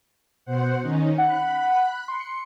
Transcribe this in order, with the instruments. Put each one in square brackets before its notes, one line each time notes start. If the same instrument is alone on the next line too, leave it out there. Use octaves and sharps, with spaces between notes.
[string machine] B2 C5 F#5
D#3 C#4 D#4
[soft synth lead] F#5 [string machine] B5 F#6
[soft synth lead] C6 [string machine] C#7